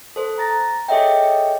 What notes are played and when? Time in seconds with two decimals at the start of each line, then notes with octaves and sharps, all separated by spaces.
0.16 A4 C5
0.38 A#5 A6 A#6
0.88 G#4 A4 C#5 D#5 E5 G5